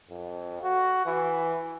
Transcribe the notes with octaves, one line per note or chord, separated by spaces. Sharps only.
F2
F#4
E3